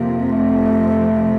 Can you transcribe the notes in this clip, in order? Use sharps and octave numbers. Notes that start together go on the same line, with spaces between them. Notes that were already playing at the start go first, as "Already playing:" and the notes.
Already playing: F2 C3 F3 A#3
A3